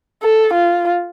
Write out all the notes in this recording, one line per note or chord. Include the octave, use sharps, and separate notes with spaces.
A4
F4